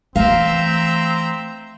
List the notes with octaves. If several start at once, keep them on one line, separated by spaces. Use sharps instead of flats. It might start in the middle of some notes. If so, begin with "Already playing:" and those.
E3 A3 C4 E5 F5 A#5